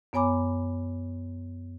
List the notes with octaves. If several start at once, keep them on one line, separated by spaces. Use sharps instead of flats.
F#2 B3 C#5 G#5 B5 D6